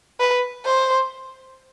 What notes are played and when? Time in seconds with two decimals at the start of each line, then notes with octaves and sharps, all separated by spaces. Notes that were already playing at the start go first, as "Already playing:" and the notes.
0.20 B4
0.66 C5